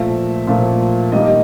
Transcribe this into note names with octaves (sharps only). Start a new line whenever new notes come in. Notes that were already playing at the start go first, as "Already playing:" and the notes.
Already playing: A#2 F3 A3 E5
A#2 F3 A3
D#3 G3 A#3 D#5